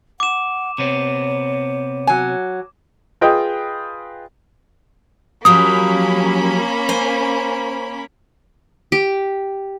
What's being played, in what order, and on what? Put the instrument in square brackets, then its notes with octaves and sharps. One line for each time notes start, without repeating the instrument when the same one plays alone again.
[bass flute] F#5 [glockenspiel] D6 E7
[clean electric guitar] C3 B3 C4 [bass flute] C#5
[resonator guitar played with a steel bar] F#3 G#5
[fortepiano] F4 G#4 B4 D#5 G5
[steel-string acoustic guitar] F3 F#3 G4 [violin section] A#3 C#4 B5 [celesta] D#6
[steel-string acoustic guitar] C5 G#5
[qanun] G4